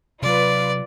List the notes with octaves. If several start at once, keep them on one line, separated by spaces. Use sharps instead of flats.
C3 F#3 F4 B4 D5